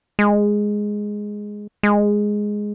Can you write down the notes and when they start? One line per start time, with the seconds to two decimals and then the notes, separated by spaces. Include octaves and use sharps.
0.19 G#3
1.83 G#3